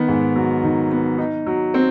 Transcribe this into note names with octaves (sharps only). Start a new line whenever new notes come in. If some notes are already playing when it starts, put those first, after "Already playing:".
Already playing: D#3 B3
G#2
F#3
D#3
B3
D#4
F#3
C4